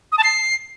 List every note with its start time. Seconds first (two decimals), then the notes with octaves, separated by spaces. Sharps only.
0.12 D#6
0.18 A5
0.24 C7